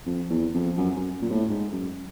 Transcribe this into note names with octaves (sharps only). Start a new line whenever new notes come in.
F2
E2
F2
F#2
F#2
A#2
A2
G#2
F#2